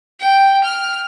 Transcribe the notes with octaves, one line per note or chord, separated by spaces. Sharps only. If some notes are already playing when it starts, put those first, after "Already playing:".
G5
F6